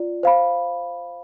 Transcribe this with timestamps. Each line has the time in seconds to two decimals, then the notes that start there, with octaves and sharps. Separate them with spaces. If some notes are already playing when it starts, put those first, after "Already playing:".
Already playing: F4 D5
0.23 C5 F5 B5